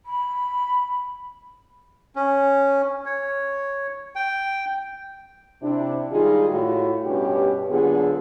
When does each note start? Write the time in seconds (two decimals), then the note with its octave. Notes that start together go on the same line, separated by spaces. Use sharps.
0.06 B5
2.16 C#4
3.06 C#5
4.15 G5
5.62 C3 D4 E4
6.10 D#3 G3 G#3 D#4 F4 G#4
6.49 A2 F4 F#4
7.05 G2 B2 C#4 G4
7.69 A#2 D3 F#3 B3 F4 G#4